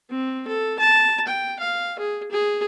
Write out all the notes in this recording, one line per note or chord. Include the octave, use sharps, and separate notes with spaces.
C4
A4
A5
G5
F5
G#4
G#4